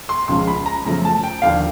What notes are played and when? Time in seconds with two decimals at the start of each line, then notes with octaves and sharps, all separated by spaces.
0.09 C6
0.28 C#2 C#3 F3 G#3 C6
0.47 B5
0.66 A#5
0.85 F#2 C#3 F3 A3 A#5
1.05 A5
1.23 G5
1.42 D#2 D3 F3 F5